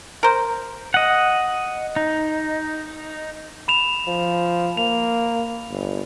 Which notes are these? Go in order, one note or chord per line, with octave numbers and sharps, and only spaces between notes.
A#4 C5
D#5 F#5
D#4
B5 E7 F7
F3
A#3 F7
G1